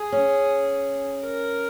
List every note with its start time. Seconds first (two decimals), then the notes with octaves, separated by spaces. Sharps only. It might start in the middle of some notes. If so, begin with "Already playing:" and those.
Already playing: G#4
0.12 C#4
1.26 A#4